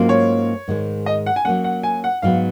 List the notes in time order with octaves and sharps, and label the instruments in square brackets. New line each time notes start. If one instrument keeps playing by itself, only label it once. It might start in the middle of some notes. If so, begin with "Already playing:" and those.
Already playing: [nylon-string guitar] G#2 F#3 A#3 C#4 F4
[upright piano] C#5
[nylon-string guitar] G#2 D#3 G#3
[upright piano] D#5
F#5
G#5
[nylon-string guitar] F#3 A#3 C#4 [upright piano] F#5
[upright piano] F#5
G#5
F#5
[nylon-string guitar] G#2 F#3 B3 [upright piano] F5